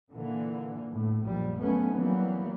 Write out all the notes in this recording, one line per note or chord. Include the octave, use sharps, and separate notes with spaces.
A#2 D3 E3 A#3
A2
A#1 F#2 A#2 G3
D#2 F#3 A3 B3 C#4
E3 F#3 G3 A#3 B3